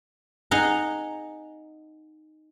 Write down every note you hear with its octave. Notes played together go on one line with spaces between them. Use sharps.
D#4 G#4 F#5 A#5